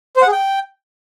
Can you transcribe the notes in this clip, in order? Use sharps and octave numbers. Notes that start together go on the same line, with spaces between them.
C5
F#5
G#4
G5